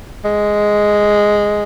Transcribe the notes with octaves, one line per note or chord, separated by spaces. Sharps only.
G#3